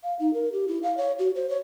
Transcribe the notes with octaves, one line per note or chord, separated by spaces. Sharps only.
F5
D#4
A#4
G4
E4
F5
C#5
F#4
C5
C#5